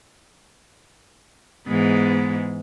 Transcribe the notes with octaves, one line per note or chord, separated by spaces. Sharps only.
G#2 E3 G#3 B3